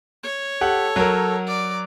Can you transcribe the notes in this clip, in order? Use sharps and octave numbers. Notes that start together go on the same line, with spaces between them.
C#5
G4 A4 F#5
F#3 A#4
D5